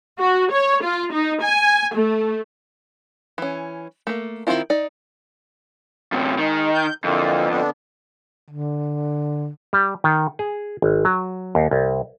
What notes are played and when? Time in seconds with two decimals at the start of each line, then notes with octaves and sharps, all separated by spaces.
0.19 F#4
0.52 C#5
0.83 F4
1.12 D#4
1.42 G#5
1.94 A3
3.38 E3 C#4
4.07 A3 A#3
4.47 D#3 F3 C4 E4 F4
4.70 D#4 D5
6.12 F#2 C3
6.39 D#3 G#3
6.74 G6
7.04 F2 D3 E3 A#3
7.49 D3 B3 D4
8.49 D3
9.73 G3
10.04 D#3
10.39 G#4
10.82 G#1
11.05 F#3
11.55 D#2
11.71 C2